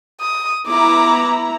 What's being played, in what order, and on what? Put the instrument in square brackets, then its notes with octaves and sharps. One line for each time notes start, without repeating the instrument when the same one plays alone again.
[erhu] D#6
[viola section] B3 E4 A#5 [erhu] D6